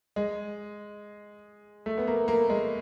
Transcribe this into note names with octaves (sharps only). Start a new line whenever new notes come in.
G#3
A3
B3
A#3
A#3
G#3